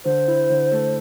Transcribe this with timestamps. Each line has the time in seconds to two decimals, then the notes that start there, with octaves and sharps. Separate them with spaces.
0.05 D3 C5
0.28 E4
0.50 D3
0.72 A3